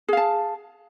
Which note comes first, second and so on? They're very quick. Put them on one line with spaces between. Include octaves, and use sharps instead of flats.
G#4 F5 A5